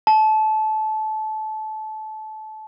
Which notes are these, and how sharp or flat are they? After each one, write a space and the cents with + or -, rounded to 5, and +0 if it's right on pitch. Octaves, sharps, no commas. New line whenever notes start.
A5 -25